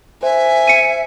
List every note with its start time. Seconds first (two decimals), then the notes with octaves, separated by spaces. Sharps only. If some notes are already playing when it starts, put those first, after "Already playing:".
0.23 C5 E5 G#5
0.67 C#7 D#7